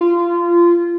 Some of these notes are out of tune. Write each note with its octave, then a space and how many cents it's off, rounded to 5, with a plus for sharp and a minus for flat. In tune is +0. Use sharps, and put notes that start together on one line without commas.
F4 -20